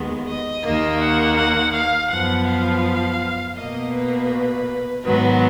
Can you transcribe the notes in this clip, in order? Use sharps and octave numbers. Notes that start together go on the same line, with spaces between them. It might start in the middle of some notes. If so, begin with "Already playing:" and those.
Already playing: D#2 D#3 G#3 B3
D#5
D#2 D#3 A#3
F#5
F#5
F5
F#2 F3 B3 F#5
F5
B2 A#3 D#5
B4
G#2 D#3 F#3 B3 B4